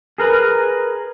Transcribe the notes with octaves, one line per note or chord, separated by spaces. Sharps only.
G#4 A#4 B4